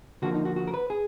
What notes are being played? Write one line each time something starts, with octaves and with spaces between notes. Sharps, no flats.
D3 F3 A#3 F#4
D#4
F#4
F#4
A#4
B4
G#4